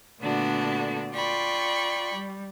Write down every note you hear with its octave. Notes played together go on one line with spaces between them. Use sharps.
A#2 D3 A3 B3 D4 F#4
F4 D5 G5 B5 C#6
G3